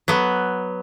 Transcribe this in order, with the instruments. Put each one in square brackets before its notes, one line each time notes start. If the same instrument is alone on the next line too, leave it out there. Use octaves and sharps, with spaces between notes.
[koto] F#3 B3